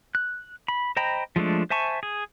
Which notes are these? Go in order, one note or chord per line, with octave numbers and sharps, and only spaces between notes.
F#6
B5
C5 D#5 G5 A#5 B5
F3 G#3 A3 D4
C5 E5 G#5 A5 C#6
G#4